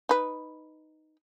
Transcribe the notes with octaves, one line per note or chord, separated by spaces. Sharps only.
D#4 B4